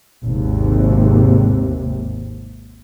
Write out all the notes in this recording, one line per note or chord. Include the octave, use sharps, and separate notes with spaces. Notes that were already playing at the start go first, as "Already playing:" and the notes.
G#1 D#2 C3